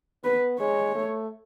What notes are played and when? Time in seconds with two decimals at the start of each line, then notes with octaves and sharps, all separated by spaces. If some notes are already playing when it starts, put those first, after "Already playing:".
0.24 B3 B4
0.60 G#3 C#5
0.95 A3